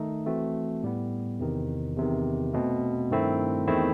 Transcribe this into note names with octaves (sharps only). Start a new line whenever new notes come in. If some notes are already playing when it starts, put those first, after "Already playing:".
Already playing: D#3 A3 D#4
E3 A3 C4 F#4
A2 G3 B3
E2 C3 D#3
E2 C3 D#3
B2 A3 C4
G2 D#3 A3 C4 E4
E2 D#3 A3 C4 E4